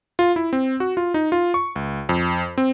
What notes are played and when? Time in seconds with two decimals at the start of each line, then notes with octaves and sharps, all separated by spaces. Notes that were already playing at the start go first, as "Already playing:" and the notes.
0.19 F4
0.36 E4
0.53 C4
0.80 F#4
0.97 F4
1.14 D#4
1.32 F4
1.54 C#6
1.76 C#2
2.09 F2
2.58 C4